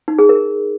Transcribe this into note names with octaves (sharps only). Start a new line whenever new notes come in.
D#4
G#4
A#4